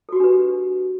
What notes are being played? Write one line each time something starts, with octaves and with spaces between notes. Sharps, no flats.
D4 F#4 G4 A4 B4